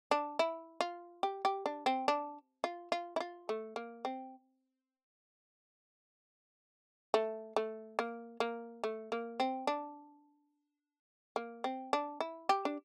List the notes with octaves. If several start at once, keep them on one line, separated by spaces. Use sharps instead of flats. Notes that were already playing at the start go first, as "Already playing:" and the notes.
D4
E4
F4
G4
G4
D4
C4
D4
F4
F4
E4
F4
A3
A#3
C4
A3
A3
A#3
A#3
A3
A#3
C4
D4
A#3
C4
D4
E4
G4
D4